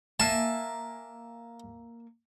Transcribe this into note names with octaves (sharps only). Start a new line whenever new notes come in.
A#3 E5 G#5 A5